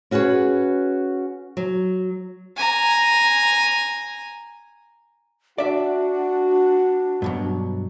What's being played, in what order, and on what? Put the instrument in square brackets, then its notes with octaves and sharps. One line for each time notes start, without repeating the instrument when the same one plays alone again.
[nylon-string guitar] C#4 F#4 G#4 B4 C#5
F#3
[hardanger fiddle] G#5 A#5
[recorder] D4 [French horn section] F#4 [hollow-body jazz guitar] D5 E5
[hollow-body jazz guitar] G2 B2 F#3